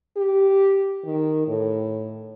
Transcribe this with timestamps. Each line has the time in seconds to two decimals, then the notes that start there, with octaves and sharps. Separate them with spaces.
0.17 G4
1.05 D#3
1.48 A2